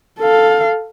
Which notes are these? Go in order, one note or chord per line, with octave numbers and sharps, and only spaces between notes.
A4 F5